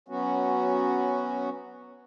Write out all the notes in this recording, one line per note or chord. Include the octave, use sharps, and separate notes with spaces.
F#3 B3 C#4 F#4